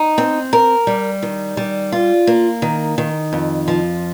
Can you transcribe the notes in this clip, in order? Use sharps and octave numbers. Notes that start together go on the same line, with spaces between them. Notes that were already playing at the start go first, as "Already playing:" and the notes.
Already playing: D#4
C4
A#4
G3
D#3
G3
F4
A#3
D#3
D#3
F2
F3